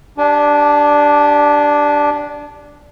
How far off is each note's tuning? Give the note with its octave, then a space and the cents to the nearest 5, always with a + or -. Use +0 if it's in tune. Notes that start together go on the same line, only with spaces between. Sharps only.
D4 +0 G4 +0 G#5 +45